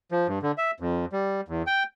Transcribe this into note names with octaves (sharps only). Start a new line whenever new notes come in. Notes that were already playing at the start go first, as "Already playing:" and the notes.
F3
G2
D3
E5
F2
G3
E2
G5